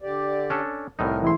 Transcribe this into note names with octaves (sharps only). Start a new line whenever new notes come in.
D3 G4 D5
C#4 D4 A4
C2 A2 D#4 A#4
F#2 C#3 E3 A3 E4 C6